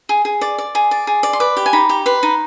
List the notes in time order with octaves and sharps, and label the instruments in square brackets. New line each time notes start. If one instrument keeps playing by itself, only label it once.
[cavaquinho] G#4
G#4
D5
D5
G#4
D5
G#4
D5
C6
B4 D6
G4
G#5
D#4 B5
G4
B4 C6
D#4